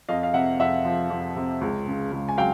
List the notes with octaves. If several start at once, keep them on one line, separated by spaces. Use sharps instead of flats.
F2 D#5 F5
F5
C3 E5 F#5
F2 E5 F#5
F3
F2
C3
C#2
C#3
C#2
G#5
F#3 F5 G5